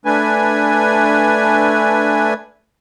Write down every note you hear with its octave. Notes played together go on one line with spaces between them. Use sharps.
A3 D4 B4 G#5